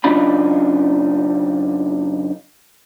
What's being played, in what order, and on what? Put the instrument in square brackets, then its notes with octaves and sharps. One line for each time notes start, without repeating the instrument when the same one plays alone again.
[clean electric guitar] F#2 C#3 D4 D#4 F4 B5